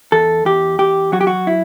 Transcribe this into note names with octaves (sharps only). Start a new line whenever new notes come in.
E2 A4
E2 G4
E2 G4
F#3 F#4
G4
F#4
E4